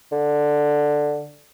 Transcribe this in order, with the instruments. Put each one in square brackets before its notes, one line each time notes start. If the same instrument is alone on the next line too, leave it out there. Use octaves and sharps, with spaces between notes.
[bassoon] D3